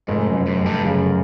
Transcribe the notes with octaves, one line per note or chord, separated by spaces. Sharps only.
F1 G#2
F#2
F1
F#2
F1
G2
F#2 C#3